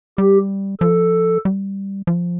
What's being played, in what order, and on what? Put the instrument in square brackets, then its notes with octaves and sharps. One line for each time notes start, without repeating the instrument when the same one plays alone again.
[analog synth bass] G3 [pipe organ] G4
[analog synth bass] F3 [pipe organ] A4
[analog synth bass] G3
F3